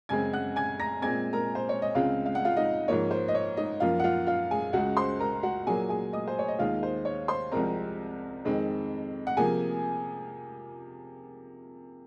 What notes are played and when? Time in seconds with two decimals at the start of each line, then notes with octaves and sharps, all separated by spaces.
0.09 F#2 C#3 G#3 C4 G#5 G#6
0.33 F#5 F#6
0.56 G#5 G#6
0.80 A#5 A#6
1.02 A#2 G#3 C4 G#5 G#6
1.33 A#4 A#5
1.55 C5
1.69 C#5
1.82 D#5
1.95 C#2 C#3 G#3 C4 F4 F5
2.26 F5
2.35 F#5
2.45 F4 F5
2.57 D#4 D#5
2.88 G#2 F3 A#3 C#5
3.11 C5
3.28 D#5
3.35 C#5
3.57 D#4 D#5
3.80 F#2 F3 A#3 F4 F5
3.99 F#5
4.04 F4 F5
4.27 F4 F5
4.51 G#4 G#5
4.73 C#2 C#3 G#3 F#4 F#5
4.97 C5 C6
5.19 A#4 A#5
5.43 F#4 F#5
5.67 A#2 F#3 A#3 G#4 G#5
5.89 G#4 G#5
6.13 D#5 D#6
6.28 C5
6.39 C#5
6.48 D#5
6.59 D#2 D#3 G#3 F4 F5
6.83 C5
7.05 C#5
7.28 C5 C6
7.52 C2 C3 F3 G#3 C4 A#4 A#5
8.45 F2 D#3 G#3 C4
9.27 F#5
9.37 C3 F3 A#3 G#4 G#5